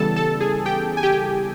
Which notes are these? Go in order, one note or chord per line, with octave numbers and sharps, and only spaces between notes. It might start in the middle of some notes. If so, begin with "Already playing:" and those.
Already playing: C#3 E3 G3 B3 A4 A5
A4 A5
G#4 G#5
G4 G5
G#5
G4 G5